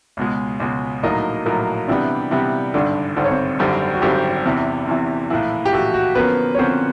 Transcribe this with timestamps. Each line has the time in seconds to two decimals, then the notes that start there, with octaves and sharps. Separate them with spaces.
0.17 C#2 B2 G#3
0.60 C#2 B2 G#3
1.03 A#1 A2 F#3 A#3 D#4 D#5
1.46 A#1 A2 F#3 A#3
1.88 C3 E3 G3 B3 D4 D5
2.31 C3 E3 G3 B3
2.74 G#1 G2 D3 D4 D5
3.16 G#1 G2 D3 C5
3.24 C#5
3.31 C4 C5
3.59 G#1 F#2 D3 G3 C4
3.94 F#4
4.02 G#1 F#2 D3 G3 C4 G4
4.45 E2 C3 E3
4.87 E2 C3 E3
5.30 A#1 A2 E3
5.65 G4
5.72 A#1 A2 E3 F#4
5.94 F#4
6.15 D3 F3 A#3 B3 C#4 B4
6.55 C#5
6.58 D3 F3 A#3 C4 C#4 C5